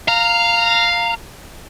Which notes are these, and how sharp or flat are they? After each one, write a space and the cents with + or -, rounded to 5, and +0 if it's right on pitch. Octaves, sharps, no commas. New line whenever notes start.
F5 +0 A#5 -15